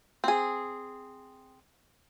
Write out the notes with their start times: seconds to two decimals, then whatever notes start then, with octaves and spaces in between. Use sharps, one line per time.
0.24 C4 G#4